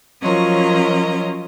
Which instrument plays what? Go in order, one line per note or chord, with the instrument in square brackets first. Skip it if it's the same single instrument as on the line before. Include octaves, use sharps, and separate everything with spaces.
[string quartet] F3 F#3 C#4 F4 A#4 D#5